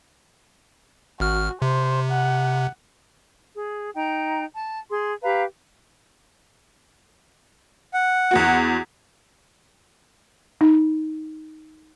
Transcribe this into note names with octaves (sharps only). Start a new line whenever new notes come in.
G#1 F#4 F6
C3 C5
F#5
G#4
D#4 G5 A#5
A5
G#4 C6
G4 B4 F5 A#5
F#5
E2 B3 F#4
D#4